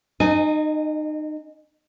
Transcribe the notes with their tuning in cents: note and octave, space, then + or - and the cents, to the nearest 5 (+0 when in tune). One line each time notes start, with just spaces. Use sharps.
D#4 -30 D#5 +0 G#5 +0